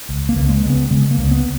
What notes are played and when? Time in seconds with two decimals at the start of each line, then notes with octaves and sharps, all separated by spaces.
0.09 C#2
0.29 A#3
0.35 C#2
0.49 G#3
0.63 C#3
0.70 B3
0.90 C#3 G#3
1.11 A#3
1.17 C#2
1.31 B3